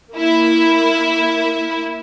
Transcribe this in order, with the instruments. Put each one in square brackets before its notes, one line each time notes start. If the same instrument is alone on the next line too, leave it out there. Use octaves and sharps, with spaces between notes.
[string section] A#3 E4